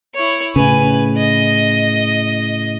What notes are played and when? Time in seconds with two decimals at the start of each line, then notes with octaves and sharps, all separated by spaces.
0.15 E4 C#5
0.56 A2 C#3 B4 G#5
1.17 D#5